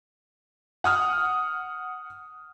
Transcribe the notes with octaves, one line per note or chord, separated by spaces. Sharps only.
F#5 D#6 F6